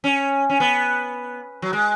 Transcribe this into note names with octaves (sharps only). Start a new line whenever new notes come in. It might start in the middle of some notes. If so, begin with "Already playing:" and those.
C#4
C#4
B3
F#3
G#3